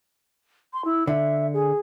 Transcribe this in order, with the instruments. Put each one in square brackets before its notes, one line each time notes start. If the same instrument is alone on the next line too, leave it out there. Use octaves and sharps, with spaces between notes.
[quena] C6
E4
[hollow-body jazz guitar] D3 [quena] E5
[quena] G#4